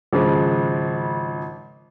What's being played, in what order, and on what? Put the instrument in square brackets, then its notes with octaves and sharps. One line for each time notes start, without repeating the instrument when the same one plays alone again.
[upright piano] G#1 C#3 F3 G#3